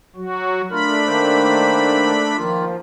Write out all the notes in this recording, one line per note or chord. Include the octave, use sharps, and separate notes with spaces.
F#3 F#4
A3 D4 F4 A#4 B5
D#3 A#3 C5
D#3 F3 A#3 F4